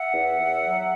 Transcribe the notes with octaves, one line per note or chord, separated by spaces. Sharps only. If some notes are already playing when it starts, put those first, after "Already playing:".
Already playing: E5 F#5
E2
E2
F#3